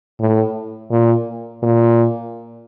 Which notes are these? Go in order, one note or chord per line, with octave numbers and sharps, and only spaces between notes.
A2
A#2
A#2